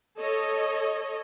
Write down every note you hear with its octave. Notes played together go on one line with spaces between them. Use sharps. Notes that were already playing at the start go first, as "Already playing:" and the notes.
A4 C#5 D#5